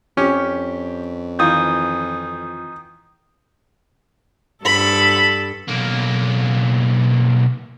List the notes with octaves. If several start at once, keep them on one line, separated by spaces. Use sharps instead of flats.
F2 C#4 G4
D#3 E3 F4 D#6 G6
G2 A4 B5
B1 A#3